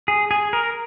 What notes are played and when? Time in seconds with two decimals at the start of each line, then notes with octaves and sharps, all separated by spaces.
0.08 G#4
0.31 G#4
0.53 A#4